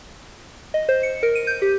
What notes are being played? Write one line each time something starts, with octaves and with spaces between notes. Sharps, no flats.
D#5
C5
C#7
A#4
D#7
G6
G4